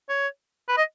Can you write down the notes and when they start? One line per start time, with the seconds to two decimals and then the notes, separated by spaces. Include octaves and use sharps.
0.09 C#5
0.68 B4
0.78 D#5